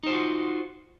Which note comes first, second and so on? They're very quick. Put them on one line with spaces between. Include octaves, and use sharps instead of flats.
D#4 C5 F4 F#4